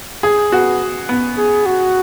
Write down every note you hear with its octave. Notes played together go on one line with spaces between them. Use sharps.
G#4
B3 F#4
B3
G#4
F#4